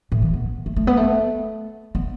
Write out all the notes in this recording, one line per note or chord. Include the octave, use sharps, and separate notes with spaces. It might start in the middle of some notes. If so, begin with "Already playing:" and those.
A2
E3
B3
A3
A3
B3
A3
B3